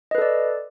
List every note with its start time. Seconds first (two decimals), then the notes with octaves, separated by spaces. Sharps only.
0.11 D#5
0.15 B4
0.18 A4
0.22 D5